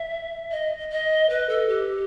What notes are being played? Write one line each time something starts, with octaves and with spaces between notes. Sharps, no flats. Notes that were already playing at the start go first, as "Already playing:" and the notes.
Already playing: E5
D#5
D#5
B4
A4
G4